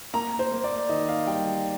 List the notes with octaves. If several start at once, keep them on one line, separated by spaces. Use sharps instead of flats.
A#3 A#5
C5
A#3
D5
D#3 D#5
F5
G3 G5